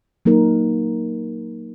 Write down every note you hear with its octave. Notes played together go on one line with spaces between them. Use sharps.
F#3 A#3 D#4 A#4